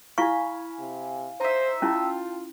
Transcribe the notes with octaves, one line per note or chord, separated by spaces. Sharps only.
E4 F5 G#5 B5 C#6
C3
D#4 C5 E5
C#4 E4 F4 G5 A5